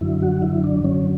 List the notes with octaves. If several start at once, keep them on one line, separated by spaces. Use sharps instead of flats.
F#2 D3 F#3 E4
F#4
E4
D4
F#2 D3 F#3 C#4